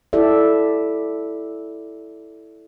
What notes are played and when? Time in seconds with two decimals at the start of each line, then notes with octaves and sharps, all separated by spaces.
0.13 E4 G4 A4 D5 E5